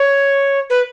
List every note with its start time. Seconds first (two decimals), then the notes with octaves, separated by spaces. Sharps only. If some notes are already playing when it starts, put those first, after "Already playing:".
Already playing: C#5
0.70 B4